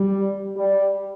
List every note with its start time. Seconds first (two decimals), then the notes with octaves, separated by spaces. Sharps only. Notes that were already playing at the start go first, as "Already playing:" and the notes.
Already playing: G3
0.57 G3